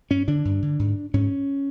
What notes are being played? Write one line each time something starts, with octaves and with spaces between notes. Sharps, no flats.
G2 C#4
D3 D4
G2
D3
G#2
G#2 C#4